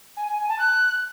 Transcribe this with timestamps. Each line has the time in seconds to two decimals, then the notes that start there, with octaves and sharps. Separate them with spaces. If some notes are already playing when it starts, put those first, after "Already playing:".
0.17 G#5
0.27 G#5
0.38 G#5
0.48 A5
0.59 F#6